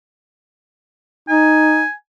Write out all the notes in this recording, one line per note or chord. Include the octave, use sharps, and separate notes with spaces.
D#4 G#5